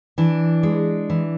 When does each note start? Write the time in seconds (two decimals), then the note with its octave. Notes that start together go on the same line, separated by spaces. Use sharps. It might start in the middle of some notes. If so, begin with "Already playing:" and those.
0.18 E3 D4
0.63 G#3
1.10 E3